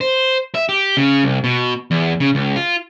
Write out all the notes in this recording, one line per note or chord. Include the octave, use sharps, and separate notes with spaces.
C5
E5
G4
C#3
C2
B2
E2
C#3
C#2
F4